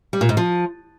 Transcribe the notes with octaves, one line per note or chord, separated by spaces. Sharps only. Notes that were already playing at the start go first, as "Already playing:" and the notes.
G3
A#2
G#2
F3